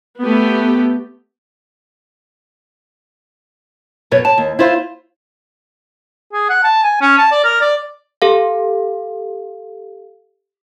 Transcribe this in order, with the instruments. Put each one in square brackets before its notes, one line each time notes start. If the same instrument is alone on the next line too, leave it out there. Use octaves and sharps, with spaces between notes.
[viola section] A3 B3 G4
[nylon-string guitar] F#2 B2 B4 C#5
A5
D#2
E4 F4 C5 F5
[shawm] G#4
F#5
A5
G#5
C#4
A5
D5
A#4
D5
[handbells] G4 A4 F5